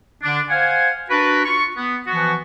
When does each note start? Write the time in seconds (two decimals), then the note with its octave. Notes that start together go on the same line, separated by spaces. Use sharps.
0.23 D3 D4
0.50 C5 F5 F#5 G#5
1.10 D4 F#4 A#4 B4
1.45 F4 C#6
1.77 B3
2.07 E3 F3 B3 F#4